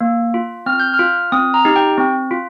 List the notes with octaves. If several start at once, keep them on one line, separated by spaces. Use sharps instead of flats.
A#3
F4
C4 F6
G6
F6
F4
C4 D#6
A#5
D#4 G4
G5
C4
F4